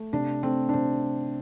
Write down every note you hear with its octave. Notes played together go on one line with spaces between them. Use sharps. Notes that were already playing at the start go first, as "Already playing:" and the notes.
Already playing: A3
C3 D4
A3 C4
D4
C3 C4